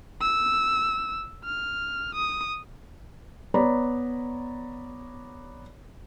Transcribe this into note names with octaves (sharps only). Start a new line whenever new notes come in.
E6
F6
D#6
B3 C#5 D5 A#5 B5